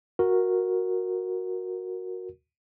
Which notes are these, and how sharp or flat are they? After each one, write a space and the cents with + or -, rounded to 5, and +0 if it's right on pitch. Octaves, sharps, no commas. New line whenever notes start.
F#4 -10 A#4 +0